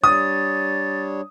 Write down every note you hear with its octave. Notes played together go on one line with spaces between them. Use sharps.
G3 D4 C#5 D#6 A6